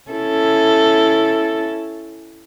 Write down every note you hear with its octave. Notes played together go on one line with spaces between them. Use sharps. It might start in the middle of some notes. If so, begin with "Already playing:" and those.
C#4 E4 A4